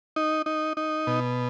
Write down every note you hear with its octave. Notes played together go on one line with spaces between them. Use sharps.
D#4
D#4
D#4
B2